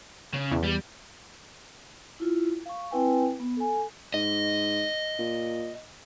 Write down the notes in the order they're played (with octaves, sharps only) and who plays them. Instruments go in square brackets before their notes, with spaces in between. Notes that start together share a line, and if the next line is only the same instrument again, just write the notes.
[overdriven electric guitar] C#3
[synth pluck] E2
[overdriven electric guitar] G3
[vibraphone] E4 F4
F5 C#6
C4 E4 B4 G5 G#5
B3
A4 G#5
[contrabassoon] G#2 [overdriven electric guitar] D#5
[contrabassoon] A#2